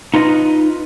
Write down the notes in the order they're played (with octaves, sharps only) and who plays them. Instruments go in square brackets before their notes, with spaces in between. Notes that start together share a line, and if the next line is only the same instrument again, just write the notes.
[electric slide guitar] D#4 F4 B4 D#5